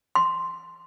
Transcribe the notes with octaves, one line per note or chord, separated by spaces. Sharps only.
C6